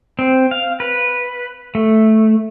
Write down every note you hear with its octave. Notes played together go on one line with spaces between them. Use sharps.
C4
F5
B4
A3